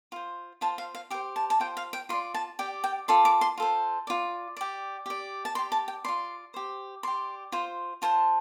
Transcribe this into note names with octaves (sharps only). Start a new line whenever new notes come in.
F4 C5
F4 C5 A5
F5
F5
G4 C5 G5
A5
A5
F4 C5 G5
F5
G5
F4 D5 C6
A5
G4 D5 G5
G5
F4 A4 D5 C6
D6
C6
F4 A4 C5
F4 D5
G4 D5
G4 D5
A5
G4 D5 C6
A5
G5
F4 D5 C6
G4 C5
G4 D5 C6
F4 C5
F4 C5 A5